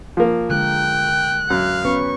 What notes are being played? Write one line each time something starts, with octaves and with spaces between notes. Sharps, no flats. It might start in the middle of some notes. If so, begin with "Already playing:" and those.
F3 A#3
D3 G#3 A#4 G5 F#6
F#2 F5
B3 C#4 B4 C#6